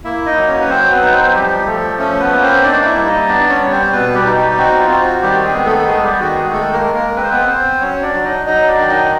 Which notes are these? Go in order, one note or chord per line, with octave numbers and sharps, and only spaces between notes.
A#3 E4 E5
D#4 D#5
F#3
C#4 C#5
B4
F#3 C4 C5
B3 B4
D#4
C4 C5
F3 G3 G4
F3 A3 A4
A3 C#4 A4
B3 B4
A#3
C4 C5
D4 D#4 D5
E4 E5
G3
D#4 D#5
B3 D4 D5
C#4 C#5
G3
C4 C5
B2 B3 B4
G3 G4
D#4
G3 G4
C4 F#4
F4
C4
F#4
D#3 G3 G4
G#3 G#4
B3
A3 A4
G#3 G#4
G3 G4
D#3 F#4
G#3 G#4
G#3 A3 A4
A#3 A#4
G#3
A#3 A#4
C4 B4
C5
B3 B4
C4 C5
F#3 C#4 C#5
D4 D5
F#3
D#4 D#5
F#3 D#4 D#5
D4 D5
D#3
D#4 D#5